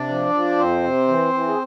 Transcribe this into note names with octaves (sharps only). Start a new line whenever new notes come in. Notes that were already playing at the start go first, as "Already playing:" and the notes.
Already playing: C3 D4 D5
F3
F3
F2 C4 C5
C3
E3
E3
G#4